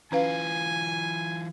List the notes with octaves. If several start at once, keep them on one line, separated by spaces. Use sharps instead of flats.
E3 C#4 F4 B4 F5 G#5